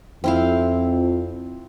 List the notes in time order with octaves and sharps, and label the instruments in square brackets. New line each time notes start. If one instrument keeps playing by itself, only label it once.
[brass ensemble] F2 [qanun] C4 E4 F5